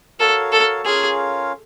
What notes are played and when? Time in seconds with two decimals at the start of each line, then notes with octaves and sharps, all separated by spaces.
0.19 F#4 A4 A#4 C#5 F5
0.52 A4
0.85 C#4 F4 G#4 A#4 C#5 F5